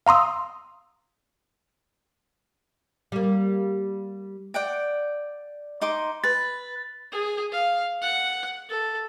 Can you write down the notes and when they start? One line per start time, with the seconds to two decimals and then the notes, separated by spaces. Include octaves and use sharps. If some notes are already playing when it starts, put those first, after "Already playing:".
0.06 F5 A#5 C6 D#6 E6
3.12 G3 A#3
4.54 D5 F#5 G5
5.81 D#4 C6 D6
6.24 B4 A6
7.12 G#4
7.52 F5
8.02 F#5
8.69 A4